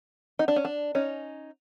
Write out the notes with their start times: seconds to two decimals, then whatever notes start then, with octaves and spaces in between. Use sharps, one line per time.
0.39 D#4
0.48 D4
0.56 C#4
0.65 D4
0.95 C#4 D#4